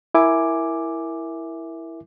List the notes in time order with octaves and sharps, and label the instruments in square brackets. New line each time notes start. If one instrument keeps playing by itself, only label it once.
[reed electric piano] E4 A#4 E5 G#5 D6